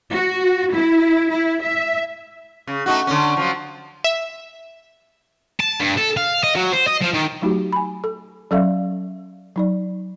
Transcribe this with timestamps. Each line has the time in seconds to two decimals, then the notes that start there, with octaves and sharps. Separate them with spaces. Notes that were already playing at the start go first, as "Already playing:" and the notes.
0.12 F#4
0.73 E4
1.31 E4
1.62 E5
2.67 C#3
2.86 A3 D#4 F#4
3.07 D3 C#4
3.37 F3 F#3
4.04 E5
5.60 A5
5.80 G2
5.98 A4
6.17 F5
6.44 D#5
6.56 F#3
6.73 C5
6.88 D#5
7.02 F3
7.14 D#3
7.42 F#3 A3 D#4 F#4 G4
7.73 G#5 B5
8.04 A4
8.51 F#3 C#4 A4 D5 E5 F5
9.56 F#3 D#4 D5